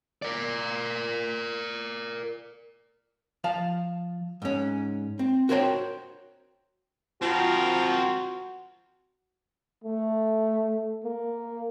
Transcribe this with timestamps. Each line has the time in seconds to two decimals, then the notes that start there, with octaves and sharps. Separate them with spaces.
0.22 A#4 D5
3.44 F3 F5 A5
4.42 G#2 C#4
5.19 C4
5.49 F#4 A#4 C5 C#5 F#5 G5
7.22 F3 C4 F#4 A#4
9.84 A3
11.04 A#3